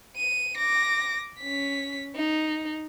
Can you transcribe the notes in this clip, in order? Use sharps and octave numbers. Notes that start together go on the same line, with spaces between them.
D#7
D6 A#6
C#4 B6
D#4